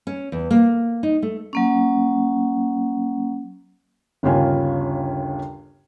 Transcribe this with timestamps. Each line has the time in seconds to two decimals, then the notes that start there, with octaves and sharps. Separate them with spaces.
0.07 C#4
0.32 E2
0.51 A#3
1.03 D#4
1.22 A3
1.53 F#3 A#3 C#4
4.23 G1 D#2 C#3 F4 G#5